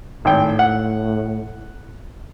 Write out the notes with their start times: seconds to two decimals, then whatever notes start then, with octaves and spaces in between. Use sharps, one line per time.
0.25 G#1 A2 G5
0.59 F#5